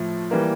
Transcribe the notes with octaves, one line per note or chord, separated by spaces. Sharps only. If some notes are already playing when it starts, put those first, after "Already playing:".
Already playing: A2 F3 A3
E3 G3 A#3